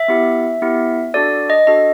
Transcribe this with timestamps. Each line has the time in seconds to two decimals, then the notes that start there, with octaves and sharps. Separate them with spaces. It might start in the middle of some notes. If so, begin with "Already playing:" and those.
Already playing: E5
0.08 B3 E4 G4
0.62 B3 E4 G4
1.14 D4 F#4 A4 D5
1.50 D#5
1.67 D4 F#4 A4 D#5